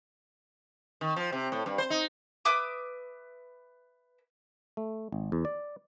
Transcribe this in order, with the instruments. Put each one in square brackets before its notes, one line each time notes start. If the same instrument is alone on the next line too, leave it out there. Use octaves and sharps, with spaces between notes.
[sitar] D#3
F3
C3
A2
G2
C5
D#4
[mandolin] B4 E5 D6 D#6
[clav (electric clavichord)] A3
G#1
E2
D5